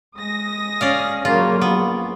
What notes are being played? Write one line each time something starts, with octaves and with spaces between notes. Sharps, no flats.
G#3 D#6 A#6
C#4 D5 F5
C#3 F#3 A#3 F4
A#1 B3